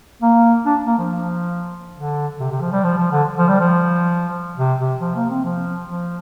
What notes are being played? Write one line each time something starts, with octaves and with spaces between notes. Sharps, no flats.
A#3
D4
A#3
F3
D3
C3
C3
F3
G3
F3
F3
D3
F3
G3
F3
C3
C3
F3
A#3
C4
F3
F3